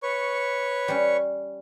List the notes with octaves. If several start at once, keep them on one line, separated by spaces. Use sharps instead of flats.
B4 C#5 C#6
G3 C#4